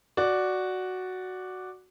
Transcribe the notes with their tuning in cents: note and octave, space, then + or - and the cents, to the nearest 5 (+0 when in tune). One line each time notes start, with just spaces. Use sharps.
F#4 +0 D5 +0